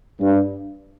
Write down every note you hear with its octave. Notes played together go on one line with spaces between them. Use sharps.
G2